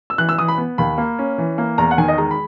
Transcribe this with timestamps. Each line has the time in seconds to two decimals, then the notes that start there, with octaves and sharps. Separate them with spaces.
0.10 E6
0.18 E3 F#6
0.29 E6
0.38 E3 D#6
0.48 B5
0.58 B3
0.78 D#2 B5
0.98 A#3
1.19 C#4
1.38 E3
1.58 A#3
1.78 E2 A#5
1.91 F#5
1.98 D#3 G#5
2.08 D#5
2.18 G#3 A#5
2.31 B5